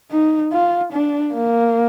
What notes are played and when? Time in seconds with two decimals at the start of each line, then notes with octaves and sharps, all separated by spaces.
0.11 D#4
0.53 F4
0.93 D4
1.34 A#3